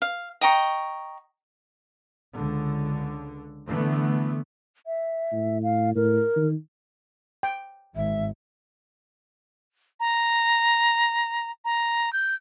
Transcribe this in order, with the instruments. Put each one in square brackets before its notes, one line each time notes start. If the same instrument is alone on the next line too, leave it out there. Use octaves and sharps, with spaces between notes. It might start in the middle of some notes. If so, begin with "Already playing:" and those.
[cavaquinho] F5
D#5 G5 A#5 C#6
[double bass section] C#2 D3
D3 E3 A3 B3
[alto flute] E5
[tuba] A2
[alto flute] F5
[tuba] A2 [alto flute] A#4
[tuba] D#3
[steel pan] G5
[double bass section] G#1 [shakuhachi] E5
[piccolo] A#5
A#5
G6